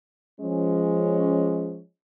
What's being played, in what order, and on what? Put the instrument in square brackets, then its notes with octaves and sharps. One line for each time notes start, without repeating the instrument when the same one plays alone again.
[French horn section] F3 G#3 C#4